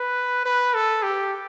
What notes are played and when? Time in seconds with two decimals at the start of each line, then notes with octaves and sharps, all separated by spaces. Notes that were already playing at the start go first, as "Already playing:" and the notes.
Already playing: B4
0.46 B4
0.74 A4
1.03 G4